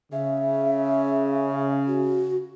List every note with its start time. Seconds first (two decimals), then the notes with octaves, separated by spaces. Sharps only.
0.13 C#3 E5
1.87 F#4